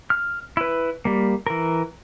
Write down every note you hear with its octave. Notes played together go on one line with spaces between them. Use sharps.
F6
E4 B4
G3 A#3
E3 A#4